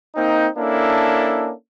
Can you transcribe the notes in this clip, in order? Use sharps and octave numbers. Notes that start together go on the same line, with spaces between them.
A#3 C4 D#4
A#3 C#4 D4 E4 A4